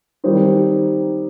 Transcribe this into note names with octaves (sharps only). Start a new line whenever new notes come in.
D#3 G3 C4 D#4